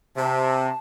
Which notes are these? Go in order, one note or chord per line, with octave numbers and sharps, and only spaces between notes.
C3 A5